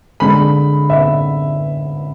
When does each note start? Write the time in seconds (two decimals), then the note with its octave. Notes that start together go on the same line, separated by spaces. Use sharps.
0.20 D3 G#3 D4 B5
0.90 E5